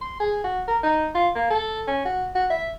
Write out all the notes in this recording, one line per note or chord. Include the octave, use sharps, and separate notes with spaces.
C6
G#4
F#4
A#4
D#4
F4
A#3
A4
C#4
F#4
F#4
E5